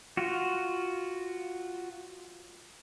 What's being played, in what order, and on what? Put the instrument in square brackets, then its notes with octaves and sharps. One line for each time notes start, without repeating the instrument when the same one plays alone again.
[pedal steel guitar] F4 F#4